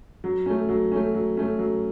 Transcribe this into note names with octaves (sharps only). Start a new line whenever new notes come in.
F#3
A3 C#4
F#3
A3 C#4
F#3
A3 C#4
F#3